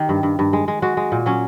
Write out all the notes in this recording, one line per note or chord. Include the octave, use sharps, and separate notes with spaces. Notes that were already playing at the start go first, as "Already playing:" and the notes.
Already playing: D#3 G4
G2
G2
G2
G#3
G#3
G#3 F#4
G#3
A#2
F#3 C#4